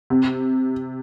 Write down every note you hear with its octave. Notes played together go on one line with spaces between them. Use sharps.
C3